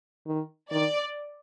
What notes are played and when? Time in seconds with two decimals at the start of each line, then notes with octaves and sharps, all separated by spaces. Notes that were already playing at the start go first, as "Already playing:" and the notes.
0.26 D#3
0.71 D#3 D5